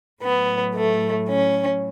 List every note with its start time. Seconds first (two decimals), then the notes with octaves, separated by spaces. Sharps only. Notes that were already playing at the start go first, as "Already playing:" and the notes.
0.22 A2 F#3 B3
0.75 A3
1.29 C#4